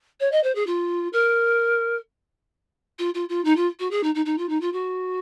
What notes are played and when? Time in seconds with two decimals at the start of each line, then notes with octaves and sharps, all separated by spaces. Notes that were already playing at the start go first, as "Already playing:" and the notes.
0.20 C#5
0.32 D#5
0.43 C5
0.55 G#4
0.67 F4
1.13 A#4
2.99 F4
3.14 F4
3.29 F4
3.45 D#4
3.56 F4
3.79 F#4
3.91 G#4
4.04 D#4
4.15 D#4
4.26 D#4
4.38 F4
4.49 D#4
4.61 F4
4.73 F#4